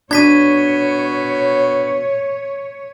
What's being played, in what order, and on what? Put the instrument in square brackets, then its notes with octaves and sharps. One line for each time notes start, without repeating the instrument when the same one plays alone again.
[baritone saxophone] B2 [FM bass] D4 [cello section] C#5 [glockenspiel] G#6 B6 D#7